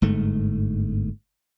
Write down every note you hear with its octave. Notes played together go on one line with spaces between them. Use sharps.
G1 G#2 A3